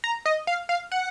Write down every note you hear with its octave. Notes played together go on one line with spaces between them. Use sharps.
A#5
D#5
F5
F5
F#5